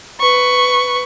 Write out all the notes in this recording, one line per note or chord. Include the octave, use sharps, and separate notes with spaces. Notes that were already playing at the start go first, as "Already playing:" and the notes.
B4 C#6